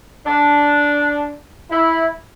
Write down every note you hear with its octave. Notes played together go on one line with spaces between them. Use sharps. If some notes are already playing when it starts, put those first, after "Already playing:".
D4
E4